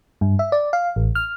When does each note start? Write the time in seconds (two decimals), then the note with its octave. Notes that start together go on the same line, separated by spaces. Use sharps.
0.21 G2
0.39 E5
0.52 D5
0.73 F5
0.96 A1
1.15 F6